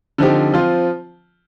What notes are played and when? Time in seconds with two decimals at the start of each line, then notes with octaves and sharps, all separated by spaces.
0.18 D3 F3 C4 D#4 G4
0.54 F3 C4 F4